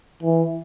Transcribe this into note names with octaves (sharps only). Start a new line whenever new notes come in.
E3